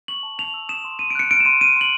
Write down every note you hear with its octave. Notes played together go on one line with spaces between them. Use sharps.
C#6 F#7
A5
A5 F7
E6
D#6 E7
C6
C6 D#7
D7
F#6 C#7
F6 D7
E7
C6 D#7
F6 D#7
C6 F#7